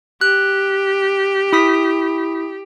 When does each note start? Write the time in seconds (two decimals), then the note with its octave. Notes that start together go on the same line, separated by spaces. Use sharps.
0.21 G4 F#6
1.53 E4 D#6 B6